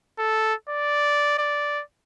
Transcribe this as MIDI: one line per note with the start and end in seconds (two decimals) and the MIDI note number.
0.19 0.54 69
0.69 1.37 74
1.38 1.82 74